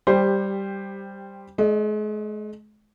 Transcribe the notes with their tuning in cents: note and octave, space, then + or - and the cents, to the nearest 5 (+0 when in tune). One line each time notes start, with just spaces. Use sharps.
G3 +0 G4 +15 C5 +0
G#3 +40 D#5 -30